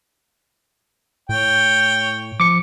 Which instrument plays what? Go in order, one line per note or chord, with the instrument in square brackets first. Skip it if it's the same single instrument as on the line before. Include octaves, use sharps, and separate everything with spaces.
[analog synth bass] A2 [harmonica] C#5 G5
[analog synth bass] F3 [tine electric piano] D6 C#7